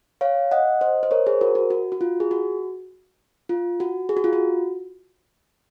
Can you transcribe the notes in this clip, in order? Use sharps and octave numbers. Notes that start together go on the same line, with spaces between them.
C#5 F5
D#5 F#5
C5 D#5
C5
A#4 C#5
G#4 C5
F#4 A#4
F#4
F#4
F#4
F4
G#4
F#4
F4
F#4
G#4
F#4
F4
F#4